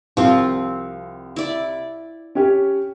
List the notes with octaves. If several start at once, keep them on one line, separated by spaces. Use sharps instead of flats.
C2 F3 C4
E4 D5
C#4 G4 C#5